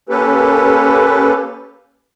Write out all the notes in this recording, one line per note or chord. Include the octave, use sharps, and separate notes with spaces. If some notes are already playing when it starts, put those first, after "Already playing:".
A#3 C#4 G4 A4 B4